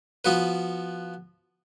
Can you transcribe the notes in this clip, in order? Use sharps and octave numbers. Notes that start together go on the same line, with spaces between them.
F3 B3 F#4 B4